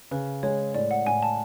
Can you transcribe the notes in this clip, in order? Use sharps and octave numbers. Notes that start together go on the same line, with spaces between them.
C#3 B4
G#3 C#5
A2 D5
F#5
A2 G#5
A5